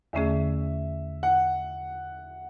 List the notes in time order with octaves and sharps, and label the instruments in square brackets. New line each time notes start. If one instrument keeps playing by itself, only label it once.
[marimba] E2 D3 A3 C#4 G#4 [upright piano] E5
[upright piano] F#5